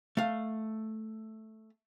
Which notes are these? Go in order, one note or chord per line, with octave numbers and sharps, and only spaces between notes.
A3 F5